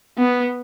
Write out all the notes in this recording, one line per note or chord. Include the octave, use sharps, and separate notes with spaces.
B3